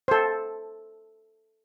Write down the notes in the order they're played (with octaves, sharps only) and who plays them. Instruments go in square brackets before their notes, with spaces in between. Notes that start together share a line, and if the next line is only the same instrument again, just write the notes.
[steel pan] A4 C5